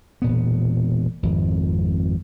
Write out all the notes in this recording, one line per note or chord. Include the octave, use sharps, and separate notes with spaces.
E1 A#2 B3
G#1 F2